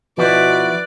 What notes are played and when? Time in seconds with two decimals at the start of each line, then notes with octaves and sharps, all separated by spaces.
0.18 B2 F3 E4 F#4 B4 D5